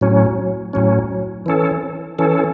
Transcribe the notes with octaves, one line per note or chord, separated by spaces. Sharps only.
A2 F#3 C#4
A2 F#3 C#4
E3 C#4 A4
E3 C#4 A4